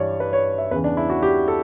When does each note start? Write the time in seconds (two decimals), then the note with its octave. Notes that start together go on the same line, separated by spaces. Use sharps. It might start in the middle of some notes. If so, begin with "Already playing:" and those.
Already playing: G2 E3 C#5 D5
0.20 B4
0.33 C#5
0.58 E5
0.71 E2 C#3 E3 B4
0.84 D4
0.97 E4
1.10 F#4
1.23 G4
1.48 A4